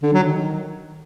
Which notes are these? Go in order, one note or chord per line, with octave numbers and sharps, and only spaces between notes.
D3
F#3
D#3